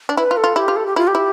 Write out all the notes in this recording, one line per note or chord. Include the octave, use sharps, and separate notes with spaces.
D4
E4 B4
F4
A4
F4
E4 G4
F4
A4
G4
E4 F4
G4
E4